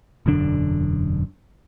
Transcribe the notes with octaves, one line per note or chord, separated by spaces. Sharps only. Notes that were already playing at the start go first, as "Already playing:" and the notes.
E1 F#2 D3 D4